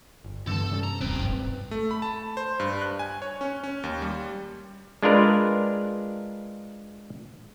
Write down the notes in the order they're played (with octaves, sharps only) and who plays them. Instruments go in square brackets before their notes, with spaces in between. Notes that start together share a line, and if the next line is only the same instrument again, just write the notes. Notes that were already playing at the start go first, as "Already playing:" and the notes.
[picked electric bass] G1
[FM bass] G2 [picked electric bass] D3 E3 B3 [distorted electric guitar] A4 A5
[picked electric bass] C3 G3 C#4
[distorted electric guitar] A#5
[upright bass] D#1 [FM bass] C4 [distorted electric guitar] B4 G5
[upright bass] G1 G#2
[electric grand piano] A3
B5
A5
C5
G2
F#6
G#5
C#5
C#4
C#4
D#2
G3
[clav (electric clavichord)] G#3 D4 F4 A#4 B4